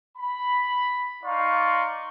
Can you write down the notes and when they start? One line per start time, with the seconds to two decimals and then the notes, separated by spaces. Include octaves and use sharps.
0.17 B5
1.24 D#4 D5 F5 C6 C#6